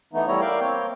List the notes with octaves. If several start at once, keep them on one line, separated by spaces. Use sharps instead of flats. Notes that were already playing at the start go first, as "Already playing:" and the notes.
E3 A3 B3 D#4
G3 A3 B3 E4 C#5 A#5
A#4 D5 E5 F5 G5
A#3 C4 C#5 G5